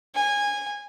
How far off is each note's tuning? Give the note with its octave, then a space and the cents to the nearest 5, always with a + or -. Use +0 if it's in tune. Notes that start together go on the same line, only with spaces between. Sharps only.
G#5 -20